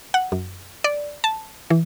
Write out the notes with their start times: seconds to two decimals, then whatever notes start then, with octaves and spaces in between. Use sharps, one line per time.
0.14 F#5
0.32 F#2
0.84 D5
1.24 A5
1.70 E3